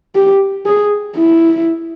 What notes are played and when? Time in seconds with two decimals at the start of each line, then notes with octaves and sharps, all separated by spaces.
0.15 G4
0.66 G#4
1.16 E4